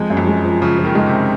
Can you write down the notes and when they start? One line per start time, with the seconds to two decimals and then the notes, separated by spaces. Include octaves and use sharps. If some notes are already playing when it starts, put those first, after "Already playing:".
Already playing: F2 G#3
0.10 F#2
0.17 F2
0.27 G#3
0.45 F3
0.61 C#3 F3
0.78 F3
0.85 D#3
0.95 G#3
1.06 C3